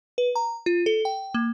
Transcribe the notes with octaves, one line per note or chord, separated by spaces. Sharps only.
B4
A#5
F4
A4
G5
A#3